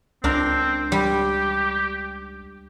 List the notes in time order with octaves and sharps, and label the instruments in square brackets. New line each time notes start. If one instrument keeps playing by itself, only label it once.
[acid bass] C#2 [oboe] C4 [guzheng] D4 A#4
[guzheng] G3 [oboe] G4